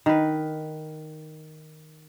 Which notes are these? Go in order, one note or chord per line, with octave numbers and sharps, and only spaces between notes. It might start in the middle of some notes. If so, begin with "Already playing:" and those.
D#3 B4